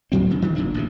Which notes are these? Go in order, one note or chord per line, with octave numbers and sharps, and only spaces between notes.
D2 A2 F#3 C4
D2 C#3
D#3
F#1 A#2 D3 D4
A1 B2 E3